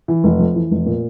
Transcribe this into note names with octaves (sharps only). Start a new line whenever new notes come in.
E3
F1
F2
E3
F1
A#2